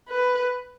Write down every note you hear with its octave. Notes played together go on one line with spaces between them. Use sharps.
B4